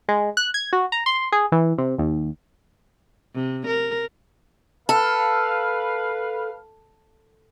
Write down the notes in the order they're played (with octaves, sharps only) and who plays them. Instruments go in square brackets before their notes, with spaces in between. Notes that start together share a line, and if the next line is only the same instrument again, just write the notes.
[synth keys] G#3
F#6
G#6
F#4
A#5
C6
G#4
E3
C3
D#2
[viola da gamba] C3
A#4
[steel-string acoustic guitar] A4 [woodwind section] B4 F5